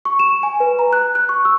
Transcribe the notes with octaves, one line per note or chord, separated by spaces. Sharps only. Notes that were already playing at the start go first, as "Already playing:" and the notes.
C#6
E7
G#5
B4
A#5
F#6
F#6
C#6
E6